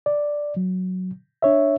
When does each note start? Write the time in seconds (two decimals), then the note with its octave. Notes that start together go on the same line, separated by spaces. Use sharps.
0.06 D5
0.57 F#3
1.42 D4 C#5 E5